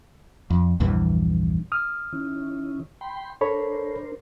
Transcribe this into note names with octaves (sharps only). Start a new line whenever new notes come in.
F2
A#1 E2 G2 E3
D#6 F6
D#3 C#4 E4
G5 B5 C6
D4 A4 A#4 C5 C#5 B5